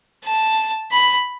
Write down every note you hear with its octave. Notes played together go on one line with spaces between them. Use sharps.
A5
B5